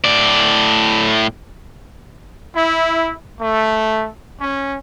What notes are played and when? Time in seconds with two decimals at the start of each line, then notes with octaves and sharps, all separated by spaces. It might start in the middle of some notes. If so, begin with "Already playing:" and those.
0.04 A2 D5
2.56 E4
3.41 A3
4.40 C#4